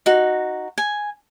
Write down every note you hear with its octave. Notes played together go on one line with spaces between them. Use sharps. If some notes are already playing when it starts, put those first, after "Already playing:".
D#4 F#4
G#5